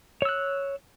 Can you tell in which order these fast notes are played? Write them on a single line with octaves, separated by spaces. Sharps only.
C#5 E6 F#6